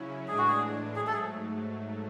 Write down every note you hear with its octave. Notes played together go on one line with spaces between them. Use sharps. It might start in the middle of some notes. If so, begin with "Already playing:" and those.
Already playing: C#3 F#3 C#4 E4
A2 E3 G#3 D4 G#4
F#4
G#4
G#2 F#3 A3 G#4
A4
G#4